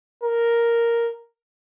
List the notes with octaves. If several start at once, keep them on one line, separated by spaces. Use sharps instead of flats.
A#4